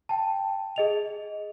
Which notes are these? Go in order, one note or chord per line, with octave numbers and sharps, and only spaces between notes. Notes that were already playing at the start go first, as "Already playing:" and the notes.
G5 A5
G#4 D#5 F7